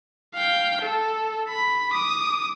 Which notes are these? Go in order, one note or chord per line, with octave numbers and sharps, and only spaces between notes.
F5 G5
A4
B5
D6 D#6